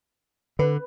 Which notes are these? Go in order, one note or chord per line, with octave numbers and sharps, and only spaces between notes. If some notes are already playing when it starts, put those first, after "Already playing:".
D3 B4